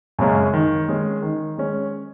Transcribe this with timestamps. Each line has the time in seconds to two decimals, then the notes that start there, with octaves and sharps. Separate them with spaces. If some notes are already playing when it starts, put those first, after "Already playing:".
0.19 F#2 C#3 G#3 C#4
0.53 D#3
0.88 G#3 C#4 G#4
1.22 D#3
1.58 G#3 C#4